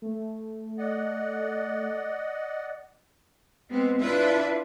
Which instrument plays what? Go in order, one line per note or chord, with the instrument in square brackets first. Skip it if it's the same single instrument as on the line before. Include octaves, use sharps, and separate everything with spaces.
[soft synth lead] A3
[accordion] D5 D#5 F#5
[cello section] G#3 B3 C4
D4 E4 F4 B4 E5